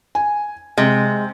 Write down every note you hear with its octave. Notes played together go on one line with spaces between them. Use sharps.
G#5
C3 G#3